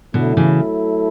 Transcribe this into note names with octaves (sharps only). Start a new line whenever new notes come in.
B2 D3 F#3 A3 E4 A4
C#3 E3